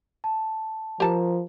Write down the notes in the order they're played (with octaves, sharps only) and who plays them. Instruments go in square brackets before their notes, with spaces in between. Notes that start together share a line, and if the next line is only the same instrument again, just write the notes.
[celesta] A5
[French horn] F3 [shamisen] G4 A5 [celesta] A#4 A#5